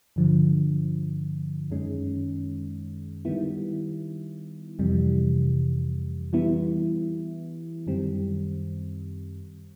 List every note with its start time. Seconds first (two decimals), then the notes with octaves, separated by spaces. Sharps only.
0.16 G2 D3 F3
1.70 F#2 D#3 G#3 C#4
3.25 D#3 G3 B3 E4
4.79 F2 C3 E3 G3
6.33 E3 G3 B3 E4
7.87 F#2 D#3 G3 C4